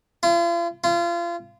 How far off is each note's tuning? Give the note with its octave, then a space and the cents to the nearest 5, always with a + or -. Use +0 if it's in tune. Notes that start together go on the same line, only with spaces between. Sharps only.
F4 -40
F4 -30